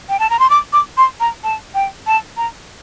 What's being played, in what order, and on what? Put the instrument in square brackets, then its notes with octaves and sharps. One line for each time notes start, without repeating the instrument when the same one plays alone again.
[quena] G5
A5
A#5
C6
D6
D6
C6
A#5
A5
G5
A5
A#5